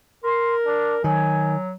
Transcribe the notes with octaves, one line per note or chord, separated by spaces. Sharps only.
A#4 C6
D4
D#3 F#3 G#5